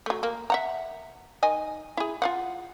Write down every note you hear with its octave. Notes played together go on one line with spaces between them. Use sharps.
F#3 A3
A#3
E5 F#5 A#5
D#3 D#5 G#5
E4 G#4
F4 F5 F#5